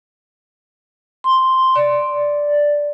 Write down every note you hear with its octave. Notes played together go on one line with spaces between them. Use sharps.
C6
D5